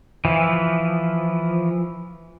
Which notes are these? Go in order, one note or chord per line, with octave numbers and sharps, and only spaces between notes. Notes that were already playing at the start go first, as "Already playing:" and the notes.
E3 F3